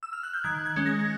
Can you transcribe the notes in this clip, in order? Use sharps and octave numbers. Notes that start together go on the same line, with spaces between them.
E6
F6
F#6
G6
D#3 F#6 G#6
F#6 G#6
G#3 C#4
G#6 A#6